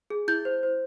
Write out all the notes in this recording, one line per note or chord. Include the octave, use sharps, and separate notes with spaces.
G#4
E4 G6
C5
C5